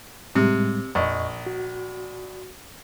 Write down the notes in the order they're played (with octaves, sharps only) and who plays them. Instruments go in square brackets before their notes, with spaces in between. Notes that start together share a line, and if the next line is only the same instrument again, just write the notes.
[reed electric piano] A2 G3 G#3 [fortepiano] C3
[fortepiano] A#1 [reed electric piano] F2 D#5 C#6
[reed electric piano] F#4